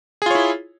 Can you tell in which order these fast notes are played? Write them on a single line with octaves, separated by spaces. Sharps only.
G#4 F4 C#5 E4